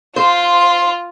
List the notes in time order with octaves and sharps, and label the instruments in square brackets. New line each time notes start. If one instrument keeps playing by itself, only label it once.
[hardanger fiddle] F4 [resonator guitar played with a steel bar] C5 [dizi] C6